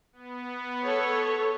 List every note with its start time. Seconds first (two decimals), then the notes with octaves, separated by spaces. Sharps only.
0.13 B3
0.83 A4 C#5